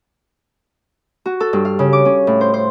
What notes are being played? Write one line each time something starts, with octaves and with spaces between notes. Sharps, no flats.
F#4
A4
G2
F5
C#3
D6
C#4
A2
C5
C5